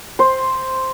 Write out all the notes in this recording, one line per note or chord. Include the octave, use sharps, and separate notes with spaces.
C5